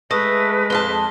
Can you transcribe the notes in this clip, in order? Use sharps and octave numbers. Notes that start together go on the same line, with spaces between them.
G#3 A3 B4 D#6 A#6
F2 F5 A5 G7